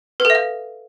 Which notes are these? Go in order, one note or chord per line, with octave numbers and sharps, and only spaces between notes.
B4
A4
E5
F5